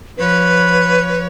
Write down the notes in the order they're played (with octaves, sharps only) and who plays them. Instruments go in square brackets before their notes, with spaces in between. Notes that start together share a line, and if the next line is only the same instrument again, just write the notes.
[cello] F3 C#5 [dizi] B4